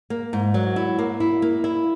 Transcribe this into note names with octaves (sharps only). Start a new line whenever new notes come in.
A#3
G#2
F#3
E4
A#3
E4
A#3
E4